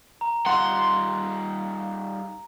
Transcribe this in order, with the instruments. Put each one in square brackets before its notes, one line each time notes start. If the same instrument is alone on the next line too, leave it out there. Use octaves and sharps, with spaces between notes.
[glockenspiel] A#5
[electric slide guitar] G3 D#4 F4 [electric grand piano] F#5 [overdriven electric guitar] C6